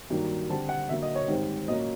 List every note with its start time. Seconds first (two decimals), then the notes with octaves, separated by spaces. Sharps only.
0.10 G2 D#3 F#3 A#3
0.49 D3 G3 C4 A5
0.69 F#5
0.89 D3 F#3 A#3 E5
1.02 D#5
1.15 C#5
1.28 G#2 D#3 G3 C4
1.67 A#2 F#3 A#3 C#4 D#5